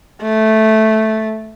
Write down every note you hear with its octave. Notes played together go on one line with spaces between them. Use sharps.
A3